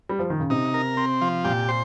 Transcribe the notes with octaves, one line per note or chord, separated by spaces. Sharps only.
G3
F3
D#3
C#3
C3 D#4
A#4
C4
F3
A#2 G4
C5